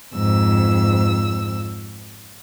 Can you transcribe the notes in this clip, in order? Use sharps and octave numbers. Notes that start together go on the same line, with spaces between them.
F2 G#2 E6